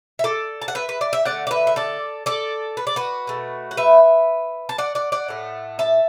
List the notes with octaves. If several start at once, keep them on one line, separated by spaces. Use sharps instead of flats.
E5
A4 D5
A5
F#5
B4 E5
B4
D5
E5
D3 A3 D5 F#5
D5
B4 E5
E5
A4 D5
A4 D5
B4
D5
F#4 B4
B2 A3
F#5
B4 E5
A5
D5 F#5
D5 F#5
D5 F#5
A2 A3
E5 A5